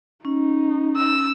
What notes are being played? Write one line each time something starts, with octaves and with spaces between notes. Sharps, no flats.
C#4 D#4
E6